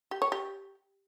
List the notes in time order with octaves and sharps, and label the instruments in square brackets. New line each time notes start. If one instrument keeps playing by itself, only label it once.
[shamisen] G4
C#5
G4